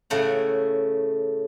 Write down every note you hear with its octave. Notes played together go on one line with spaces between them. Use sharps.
A2 C#3 A3 F#5